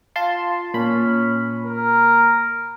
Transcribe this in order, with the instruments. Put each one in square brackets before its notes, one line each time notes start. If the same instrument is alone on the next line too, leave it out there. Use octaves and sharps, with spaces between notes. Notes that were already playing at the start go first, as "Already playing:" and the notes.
[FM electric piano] F4 A5 C6
[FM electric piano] A#2 B5 [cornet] C#4
[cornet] A#4